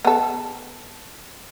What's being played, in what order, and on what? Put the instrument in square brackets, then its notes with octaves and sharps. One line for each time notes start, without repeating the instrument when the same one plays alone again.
[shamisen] B3 A4